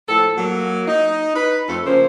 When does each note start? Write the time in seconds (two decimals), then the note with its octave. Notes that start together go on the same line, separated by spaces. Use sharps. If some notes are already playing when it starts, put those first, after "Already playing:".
0.08 A2 F3 A4
0.37 F#3 A#3
0.87 D#4
1.35 B4
1.67 F2 A3 A4
1.85 C#3 F3 A#3 C#4 C5